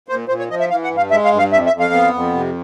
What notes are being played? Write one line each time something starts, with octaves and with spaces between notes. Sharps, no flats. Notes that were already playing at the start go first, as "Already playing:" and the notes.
A#2 C5
A#2 C5
C#5
F3 D#5
E5
E3 F5
F#5
G2
F5
G#3 E5
F5
G2
F5
F2 E5
E5
F2
F5
B3
F2
C3